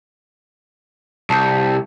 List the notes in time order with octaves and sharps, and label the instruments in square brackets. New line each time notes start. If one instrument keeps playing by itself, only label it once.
[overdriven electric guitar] C2 [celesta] A5 G6